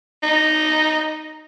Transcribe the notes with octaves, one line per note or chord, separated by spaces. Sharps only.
D#4